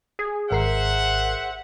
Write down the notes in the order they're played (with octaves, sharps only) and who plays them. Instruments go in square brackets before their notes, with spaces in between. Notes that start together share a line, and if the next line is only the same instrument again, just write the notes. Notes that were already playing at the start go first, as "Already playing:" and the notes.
[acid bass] G#4
[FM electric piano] G#1 A#4 C7 [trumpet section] C5 E5 F#5